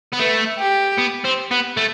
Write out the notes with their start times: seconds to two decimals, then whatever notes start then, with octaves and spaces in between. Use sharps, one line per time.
0.13 B3
0.19 A3 B4
0.58 G4
0.98 B3
1.24 C4
1.51 B3
1.77 A3